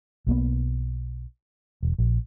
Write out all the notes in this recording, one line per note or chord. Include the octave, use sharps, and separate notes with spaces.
B1 A#3 B3
E1
A#1